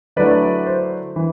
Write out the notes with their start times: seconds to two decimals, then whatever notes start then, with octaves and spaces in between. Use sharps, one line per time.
0.16 D3 F#3 A3 E4 B4 D5
0.66 C5
1.16 E3